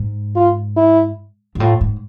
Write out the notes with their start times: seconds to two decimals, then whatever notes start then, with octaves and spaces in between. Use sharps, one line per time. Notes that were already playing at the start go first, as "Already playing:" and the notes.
Already playing: G#2
0.36 F4
0.77 E4
1.55 G#2
1.60 A2 F4
1.81 G#2